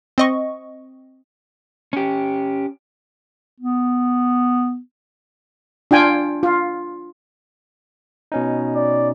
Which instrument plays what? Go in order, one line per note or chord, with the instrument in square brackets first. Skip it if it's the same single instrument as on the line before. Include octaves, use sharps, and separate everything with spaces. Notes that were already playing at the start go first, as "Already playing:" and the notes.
[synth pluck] C4 D#5 C#6
[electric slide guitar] C#4 G4
[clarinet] B3
[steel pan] D4 F4 G5 G#5
F4
[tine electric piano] B2 C#4 D#4
[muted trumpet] D5